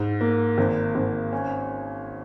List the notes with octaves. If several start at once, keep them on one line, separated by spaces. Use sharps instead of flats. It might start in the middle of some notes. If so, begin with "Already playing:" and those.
Already playing: G#2
A#3
G#1
G#1
C#4